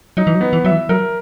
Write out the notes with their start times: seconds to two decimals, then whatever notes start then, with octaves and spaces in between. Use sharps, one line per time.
0.17 F#3 D#4
0.27 E3
0.35 F#3
0.41 B3
0.53 E3
0.65 F#3 E5
0.71 E3
0.89 F#3 A#4